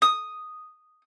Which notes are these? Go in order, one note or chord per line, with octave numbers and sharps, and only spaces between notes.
D#6